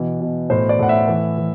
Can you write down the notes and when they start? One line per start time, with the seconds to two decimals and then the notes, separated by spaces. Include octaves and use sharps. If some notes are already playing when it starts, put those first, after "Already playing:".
Already playing: B2 E3
0.21 B2
0.50 A2 C5
0.69 D5
0.79 A2 F#5
0.89 E5
1.08 E3
1.38 E3